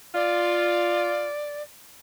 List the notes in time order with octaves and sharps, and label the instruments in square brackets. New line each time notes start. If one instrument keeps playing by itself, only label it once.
[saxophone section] F4 [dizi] D5